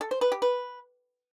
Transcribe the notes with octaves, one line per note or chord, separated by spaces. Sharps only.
A4
C5
B4
G4
B4